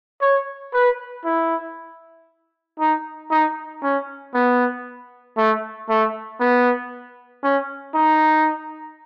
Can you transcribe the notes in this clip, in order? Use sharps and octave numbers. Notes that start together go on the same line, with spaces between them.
C#5
B4
E4
D#4
D#4
C#4
B3
A3
A3
B3
C#4
D#4